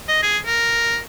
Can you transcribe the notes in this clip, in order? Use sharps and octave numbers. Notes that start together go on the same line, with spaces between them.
D#5
G#4
A#4